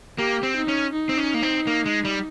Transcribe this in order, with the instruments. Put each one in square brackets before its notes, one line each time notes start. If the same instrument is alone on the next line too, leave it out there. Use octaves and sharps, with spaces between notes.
[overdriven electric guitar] A#3 [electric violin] G4
[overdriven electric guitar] C4
[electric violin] D#4
[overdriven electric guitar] C#4
[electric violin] D#4
[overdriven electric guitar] C4
C#4
A#3
C4
A#3
G#3
G3